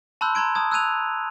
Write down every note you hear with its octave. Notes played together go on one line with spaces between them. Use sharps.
A5 B5 C6 E6 F#6 G6
A#5 C6 G#6 D7
A5 D#6 G#6
E6 F#6 G#6 D#7 F7